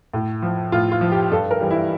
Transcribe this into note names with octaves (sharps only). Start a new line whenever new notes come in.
A2
F3
A2 F4
F4
F3
G4
G2 A4
A#4
E3 G3
E4